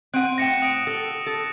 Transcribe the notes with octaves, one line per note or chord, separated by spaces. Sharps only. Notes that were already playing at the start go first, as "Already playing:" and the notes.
C4 F#5 F#6 D7 D#7
A2 G5 A#6 C#7 E7
D#6 D7
A4
A4